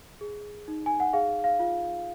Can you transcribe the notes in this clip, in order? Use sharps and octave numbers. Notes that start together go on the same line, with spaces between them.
G#4
D#4
G#5
F#5
G#4 F5
F5
F4